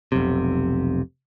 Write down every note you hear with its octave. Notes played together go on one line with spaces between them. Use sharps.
F1 B1 C3